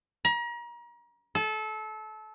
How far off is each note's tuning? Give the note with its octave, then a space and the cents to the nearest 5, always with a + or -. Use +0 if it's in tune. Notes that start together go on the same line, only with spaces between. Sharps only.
A#5 +35
A4 -25